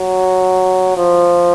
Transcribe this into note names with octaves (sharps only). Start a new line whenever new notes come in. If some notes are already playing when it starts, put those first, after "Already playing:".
Already playing: F#3
F3